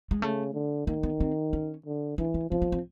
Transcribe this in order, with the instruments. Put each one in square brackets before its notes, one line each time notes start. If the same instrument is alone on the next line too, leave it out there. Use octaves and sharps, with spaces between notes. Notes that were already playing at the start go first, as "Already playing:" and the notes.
[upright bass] G#3
[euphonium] C#3 [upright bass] A3
[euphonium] D3
[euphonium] D#3 [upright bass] A#3
[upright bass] B3
C4
C#4
[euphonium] D3
[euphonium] E3 [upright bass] D4
[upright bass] C#4
[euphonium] F3 [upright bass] C4
[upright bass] B3
C4